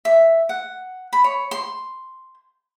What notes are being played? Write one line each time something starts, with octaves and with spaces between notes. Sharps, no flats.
E5
F#5
B5
C#5
C6